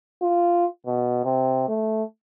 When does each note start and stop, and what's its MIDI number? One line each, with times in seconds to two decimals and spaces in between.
0.22 0.66 65
0.86 1.21 47
1.25 1.67 48
1.69 2.04 57